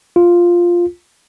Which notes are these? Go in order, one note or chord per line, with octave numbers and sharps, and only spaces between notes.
F4